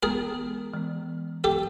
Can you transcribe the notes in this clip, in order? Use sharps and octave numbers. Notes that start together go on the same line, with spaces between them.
E3 G#3 B3 G#4 A#4
E3 G#3 B3
E3 G#3 B3 G4 A4